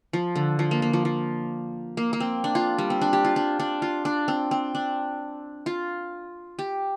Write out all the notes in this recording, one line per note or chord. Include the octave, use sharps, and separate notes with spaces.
F3
D3
F3
A#3
A#3
F3
F3
A#3
A#3
C4
D4
F4
G3
C4
D4
G4
F4
D4
D4
F4
D4
C4
C4
D4
F4
G4